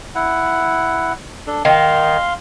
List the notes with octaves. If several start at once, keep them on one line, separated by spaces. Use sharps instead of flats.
E4 F#5
D4 A4
D#3 F5 C6